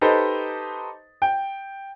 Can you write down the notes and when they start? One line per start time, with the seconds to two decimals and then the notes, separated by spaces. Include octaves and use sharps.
0.01 D#4 G4 A4 B4 C5 D#5
1.22 G5